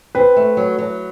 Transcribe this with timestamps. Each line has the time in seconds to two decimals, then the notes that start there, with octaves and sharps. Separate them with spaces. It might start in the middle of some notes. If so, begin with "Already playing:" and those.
0.15 C4 B4
0.37 A3
0.57 F#3
0.79 F#3